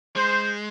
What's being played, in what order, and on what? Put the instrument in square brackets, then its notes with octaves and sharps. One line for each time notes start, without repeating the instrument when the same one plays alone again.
[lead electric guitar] G#3 [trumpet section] C5